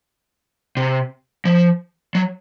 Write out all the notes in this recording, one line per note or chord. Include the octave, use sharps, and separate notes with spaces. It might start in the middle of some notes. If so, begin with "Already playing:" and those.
C3
F3
F#3